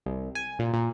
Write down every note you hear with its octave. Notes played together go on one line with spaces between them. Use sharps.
C2
G#5
A#2
A#2